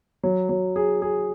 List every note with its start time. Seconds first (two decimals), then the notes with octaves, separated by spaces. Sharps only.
0.23 F#3
0.49 F#3
0.76 G#4
1.02 G#4